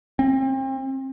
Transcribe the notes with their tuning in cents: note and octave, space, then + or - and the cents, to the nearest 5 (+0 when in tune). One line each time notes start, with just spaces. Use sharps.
C4 +35